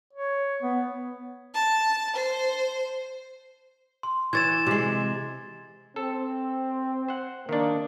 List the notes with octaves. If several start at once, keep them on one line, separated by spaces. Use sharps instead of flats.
C#5
B3
A5
C5
C6
E3 C#5 G#6 A6 E7
C3 G#3
C4 A4
C5 F#5
D#3 A#3 D4